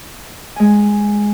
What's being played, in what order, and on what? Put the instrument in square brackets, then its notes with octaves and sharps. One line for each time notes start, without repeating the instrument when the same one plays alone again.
[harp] G#3 G#5